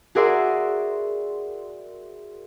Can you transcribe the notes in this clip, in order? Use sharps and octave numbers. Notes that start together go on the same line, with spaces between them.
F#4 G#4 A#4 D5 E5 C6